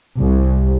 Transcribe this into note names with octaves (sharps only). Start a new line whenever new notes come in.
C2